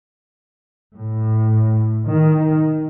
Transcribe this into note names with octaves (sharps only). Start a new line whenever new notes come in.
A2
D#3